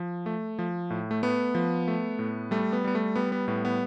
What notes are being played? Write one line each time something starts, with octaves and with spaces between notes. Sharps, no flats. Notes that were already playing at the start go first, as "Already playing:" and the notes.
Already playing: F3
A3
F3
A2
A3
A3 B3
F3
A3
A2
G3 A3
B3
G3 B3
A3
G3 B3
B3
A2 B3
B3